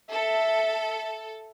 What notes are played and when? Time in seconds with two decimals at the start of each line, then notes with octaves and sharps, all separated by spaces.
0.13 A4 E5